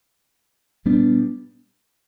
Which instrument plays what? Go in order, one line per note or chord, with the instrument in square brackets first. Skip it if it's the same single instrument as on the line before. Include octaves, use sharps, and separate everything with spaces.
[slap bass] A#2 G3 B3 D4